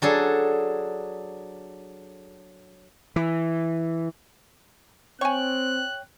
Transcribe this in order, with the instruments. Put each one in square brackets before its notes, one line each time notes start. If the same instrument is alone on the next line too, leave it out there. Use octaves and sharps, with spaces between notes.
[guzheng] F#3 D4 G#4 A4
[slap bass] E3
[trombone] C4 [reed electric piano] C#5 G5 [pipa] G#5 C#6 [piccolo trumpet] F#6